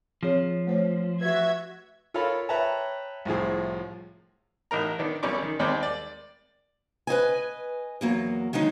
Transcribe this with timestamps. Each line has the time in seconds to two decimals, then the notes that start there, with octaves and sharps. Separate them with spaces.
0.23 F3 C4 G#4 C#5
0.67 A3 C5 C#5
1.21 F#4 B4 E5 G#6
2.14 F4 A4 A#4 C#5 F5 B5
2.49 B4 C#5 E5 G5 A5 A#5
3.25 C2 A2 F3 G#4
4.71 A1 D#4 A#4 A#5
4.99 D#3 B3 D4
5.23 B1 F#3 G3 C#4 C#6 D6
5.42 D#3
5.59 D#2 G3 G#3 C4 G5
5.83 D5
7.07 B4 C5 D#5 G#5
8.01 E2 F#3 A#3
8.53 D3 D#3 F#3 G#3 D#4